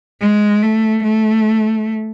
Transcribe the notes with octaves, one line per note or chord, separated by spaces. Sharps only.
G#3
A3
A3